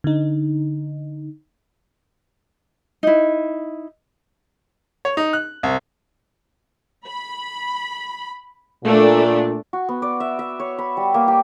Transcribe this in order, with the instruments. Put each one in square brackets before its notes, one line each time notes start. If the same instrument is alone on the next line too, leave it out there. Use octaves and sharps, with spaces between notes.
[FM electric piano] D3 D#4
[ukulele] D#4 E4
[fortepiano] C#5
D#4
F#6
C2
[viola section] B5
[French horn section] A#2 [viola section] A3 D4
[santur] F#4
B3
D5
E5
E5
C#5
B5
G3
A#3
G4